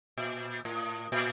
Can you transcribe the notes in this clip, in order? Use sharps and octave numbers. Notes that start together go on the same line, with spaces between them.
A#2
A2
A#2